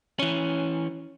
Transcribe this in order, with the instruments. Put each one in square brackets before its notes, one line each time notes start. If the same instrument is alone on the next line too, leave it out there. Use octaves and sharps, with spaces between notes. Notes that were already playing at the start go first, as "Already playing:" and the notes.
[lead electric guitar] E3 C#4